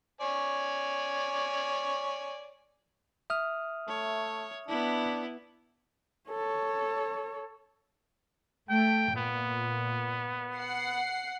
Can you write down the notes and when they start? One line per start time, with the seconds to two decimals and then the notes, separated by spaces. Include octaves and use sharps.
0.21 C#5 D5 G#5
3.30 E5 D#6 F6
3.88 A3 C#5
4.68 B3 D4 E4
6.30 A4 C#5
8.70 A3 G5
9.16 A#2 B3
10.56 F#5 C7